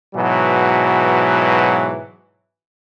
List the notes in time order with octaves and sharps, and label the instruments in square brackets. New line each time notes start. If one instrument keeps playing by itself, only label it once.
[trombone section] G#2 B2 E3 F#3